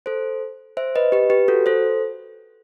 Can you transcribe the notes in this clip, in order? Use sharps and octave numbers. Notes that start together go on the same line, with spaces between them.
A4 C5
C5 E5
B4 D#5
G4 B4
G4 B4
F#4 A4
A4 C5